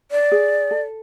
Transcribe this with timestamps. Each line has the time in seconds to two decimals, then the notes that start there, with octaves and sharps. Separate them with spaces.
0.11 D5
0.32 G#4
0.71 A4